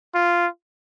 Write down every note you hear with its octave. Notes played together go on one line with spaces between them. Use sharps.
F4